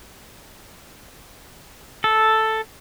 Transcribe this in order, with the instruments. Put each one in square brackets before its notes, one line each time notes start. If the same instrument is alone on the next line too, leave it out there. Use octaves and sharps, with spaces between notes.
[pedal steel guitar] A4